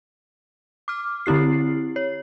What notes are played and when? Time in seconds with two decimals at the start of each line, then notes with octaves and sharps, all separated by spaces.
0.88 D6 F6
1.26 D3 C4 E4 G4 C7
1.96 C#5